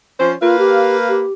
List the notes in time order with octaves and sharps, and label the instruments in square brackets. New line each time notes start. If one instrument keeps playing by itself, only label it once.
[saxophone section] F3 C#4 C5
[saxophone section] A#3 B4 F5 [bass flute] F4
[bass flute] G4
G4